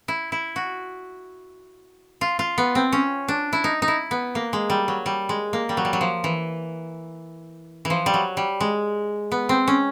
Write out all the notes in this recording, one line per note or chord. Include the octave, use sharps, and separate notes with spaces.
E4
E4
F#4
F4
F4
B3
C4
C#4
D4
E4
D#4
D#4
E4
B3
A#3
G#3
G3
F#3
G3
G#3
A#3
G3
F#3
G3
F#3
F3
E3
E3
F3
G3
F#3
G3
G#3
B3
C4
C#4